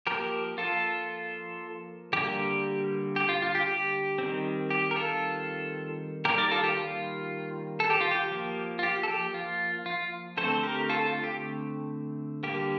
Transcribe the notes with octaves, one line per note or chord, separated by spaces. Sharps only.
F3 A#3 G4 A#4
F4 A4
D3 G3 A#3 G4
G4
F4
F4
G4
G4
D#3 G3 C4
G4
A#4
F4 A4
D#3 G3 A#3 G4 A#4
A#4 D5
F4 A4
G4
F4
A4
G4
F4
G4
F3 A#3
F4
G4
A4
G4
F4
F4
D3 A3 C4 A4 C5
G4 A#4
F4 A4
F4
G4
D3 G3 A#3 G4